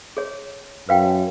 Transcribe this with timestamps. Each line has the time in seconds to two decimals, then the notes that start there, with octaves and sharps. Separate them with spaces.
0.17 G#4 C#5
0.89 F#2 B4 F5 G5